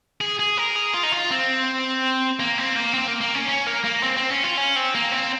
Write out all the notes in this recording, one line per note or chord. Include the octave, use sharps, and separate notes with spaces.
G#4
G#4
A#4
G#4
F4
D#4
F4
C4
A#3
C4
A#3
C4
A#3
A#3
C#4
C#4
A#3
A#3
C4
C4
C#4
F4
C#4
C4
A#3
C4